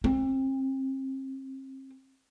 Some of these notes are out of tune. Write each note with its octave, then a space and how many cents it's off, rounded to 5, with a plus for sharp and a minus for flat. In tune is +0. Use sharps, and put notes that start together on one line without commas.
C4 +35